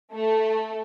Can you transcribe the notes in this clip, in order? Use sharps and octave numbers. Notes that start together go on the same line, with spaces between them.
A3